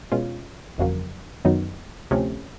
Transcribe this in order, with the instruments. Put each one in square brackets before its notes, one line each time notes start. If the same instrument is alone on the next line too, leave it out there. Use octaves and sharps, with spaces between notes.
[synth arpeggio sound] B2 G#3 C#4 F4
G1 F2 C#3 F#3 A#3
F#2 D#3 F#3 B3 D#4
D2 C3 F3 A3 C#4